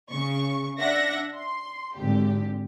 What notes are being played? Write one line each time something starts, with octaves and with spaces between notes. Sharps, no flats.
C#3 C#6
D4 E5 F#5 A#6
C6
G#1 D3 G4